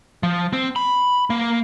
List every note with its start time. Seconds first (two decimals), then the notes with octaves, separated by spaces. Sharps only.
0.23 F3
0.53 C4
0.76 B5
1.30 A#3